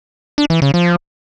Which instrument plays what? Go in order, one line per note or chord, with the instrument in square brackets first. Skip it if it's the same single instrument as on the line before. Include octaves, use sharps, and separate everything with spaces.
[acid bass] D4
E3
C#3
F3